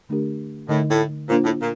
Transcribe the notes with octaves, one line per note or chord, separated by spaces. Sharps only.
D3 A3 D4 G4 A#4
A2 D3 A3 D#4 A#4 D#5
A2
A#2 A#3 D4 F4 C5
A2
A#2